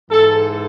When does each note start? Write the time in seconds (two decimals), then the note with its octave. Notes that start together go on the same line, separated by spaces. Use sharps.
0.10 G#2 E3 A4